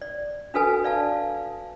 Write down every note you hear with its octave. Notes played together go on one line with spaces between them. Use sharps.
D5
D4 F#4 A4 B4 G#5
D5 F5 A5